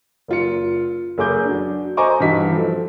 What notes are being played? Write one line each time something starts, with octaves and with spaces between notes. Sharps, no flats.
F#1 F4 C#7
F#1 G#4 D6 G6
F#3 D4
C5 D#5 G#5 A#5 C#6 D6
G2 E3 D#4 F#4 B6
F3 A4